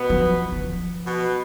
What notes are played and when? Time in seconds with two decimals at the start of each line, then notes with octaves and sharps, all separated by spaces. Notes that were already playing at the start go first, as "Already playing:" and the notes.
Already playing: B2 B3
0.10 F3
0.52 D#3
0.64 F3
1.05 B2 B3